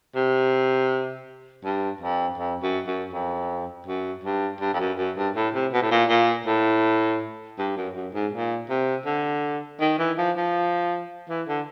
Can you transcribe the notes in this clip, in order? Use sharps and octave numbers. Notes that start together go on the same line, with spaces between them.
C3
G2
F2
F2
F#2
F#2
F2
F#2
G2
G2
F2
F#2
F#2
G2
A2
C3
B2
A2
A#2
A#2
A2
G2
F#2
F#2
G#2
A#2
C3
D3
D#3
E3
F3
F3
E3
D3